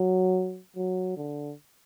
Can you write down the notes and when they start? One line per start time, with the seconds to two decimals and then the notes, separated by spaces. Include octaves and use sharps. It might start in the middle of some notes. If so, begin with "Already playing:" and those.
Already playing: F#3
0.76 F#3
1.17 D3